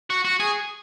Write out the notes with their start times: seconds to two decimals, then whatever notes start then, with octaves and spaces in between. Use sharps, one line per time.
0.10 F#4
0.25 F#4
0.40 G#4